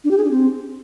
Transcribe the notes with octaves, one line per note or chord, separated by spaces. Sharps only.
D4
G4
G#4
D4
C4